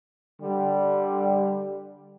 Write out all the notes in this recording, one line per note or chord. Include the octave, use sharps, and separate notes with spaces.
D3 G3